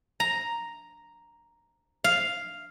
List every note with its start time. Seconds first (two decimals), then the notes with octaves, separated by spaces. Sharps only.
0.20 A#5
2.04 F5